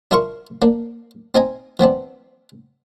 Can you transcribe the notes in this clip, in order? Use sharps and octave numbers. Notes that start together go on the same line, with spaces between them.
D4 E4 F4 A#4 C6 C#6
A#3 D4
C4 D#4 G#5 A#5
E3 B3 C4 D4